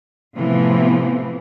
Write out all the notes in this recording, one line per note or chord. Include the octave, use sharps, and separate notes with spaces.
A2 C3 E3 F3 B3